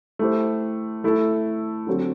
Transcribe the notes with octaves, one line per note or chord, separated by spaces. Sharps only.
A3 E4 G4 C5
A3 E4 A4
D3 F#3 C4 F#4 A4